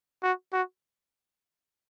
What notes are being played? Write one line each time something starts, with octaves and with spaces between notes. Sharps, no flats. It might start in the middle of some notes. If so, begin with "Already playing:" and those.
F#4
F#4